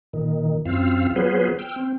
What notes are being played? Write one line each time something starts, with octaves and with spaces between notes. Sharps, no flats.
A#2 D#3
F#2 C4 F4 F5 E6
F#3 B3 F4 G#4 B4 C5
G5 E6 F6
C4